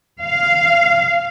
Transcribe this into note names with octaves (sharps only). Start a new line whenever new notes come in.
F5